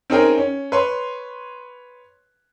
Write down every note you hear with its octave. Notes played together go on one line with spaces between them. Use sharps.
C4 C#4 D#4 G#4 A#4 G5
C#4
B4 C#5 C6